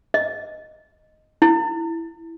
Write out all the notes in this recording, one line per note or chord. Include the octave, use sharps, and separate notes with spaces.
D#5
E4